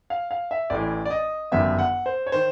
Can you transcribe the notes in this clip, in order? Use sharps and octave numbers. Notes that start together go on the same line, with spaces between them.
F5
F5
E5
A1 A2 E3 D5
D5
D#5
G1 F#2 D#3 E5
F#5
C5
C#5
D#3 C5